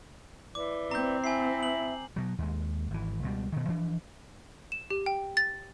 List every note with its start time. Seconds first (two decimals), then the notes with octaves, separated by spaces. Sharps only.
0.55 E3 D5 D6
0.91 C4 A#5 G6
1.24 E4 E5 G#5 C7
1.63 F#7
2.16 B2 F#3
2.38 D#2 G#3
2.91 G#1 E3
3.22 C#2 B2 G3
3.52 B2 D#3
3.68 E3 F3 D4
4.72 E7
4.90 G4
5.06 G5
5.37 A6